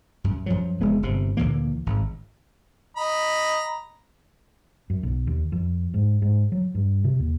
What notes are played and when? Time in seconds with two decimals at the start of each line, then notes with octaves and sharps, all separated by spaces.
0.24 F#2
0.46 F#2 F3 F#3
0.81 F1 G#3 B3
1.03 G1 C3
1.37 D2 A#2 E3 A#3
1.86 G#1
2.96 D#5 A#5 B5
4.90 F#2
5.03 B1
5.27 D#2
5.52 F2
5.94 G#2
6.22 G#2
6.52 F#3
6.75 G2
7.04 C3
7.19 D#2